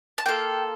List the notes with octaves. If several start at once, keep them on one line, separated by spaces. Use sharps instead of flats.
A5
A#3 F4 A4 G5